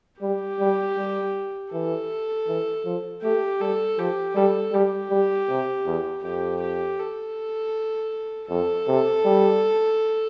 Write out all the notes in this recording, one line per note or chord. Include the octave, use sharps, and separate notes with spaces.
G3 G4
G3
G3
E3 A4
E3
F3
A3 G4
G3 A4
F3 G4
G3 A4
G3 G4
G3
C3
E2
F2 G4
G4
A4
F2 A4
C3
G3